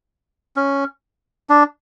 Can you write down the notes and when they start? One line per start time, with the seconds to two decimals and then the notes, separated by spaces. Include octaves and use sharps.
0.56 C#4
1.49 D4